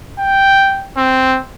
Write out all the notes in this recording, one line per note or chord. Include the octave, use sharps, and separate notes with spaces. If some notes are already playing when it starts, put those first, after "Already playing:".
G5
C4